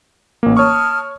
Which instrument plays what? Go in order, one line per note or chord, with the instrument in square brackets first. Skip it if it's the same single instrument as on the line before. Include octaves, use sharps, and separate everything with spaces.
[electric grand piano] A1 A#3
[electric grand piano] C#5 C#6 [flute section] A5 D#6 F6